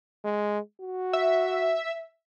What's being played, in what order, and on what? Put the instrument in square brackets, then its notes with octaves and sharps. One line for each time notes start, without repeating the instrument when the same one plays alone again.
[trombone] G#3
F#4
[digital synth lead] E5